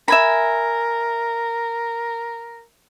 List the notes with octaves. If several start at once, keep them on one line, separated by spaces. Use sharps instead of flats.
A#4 E5 G#5 B5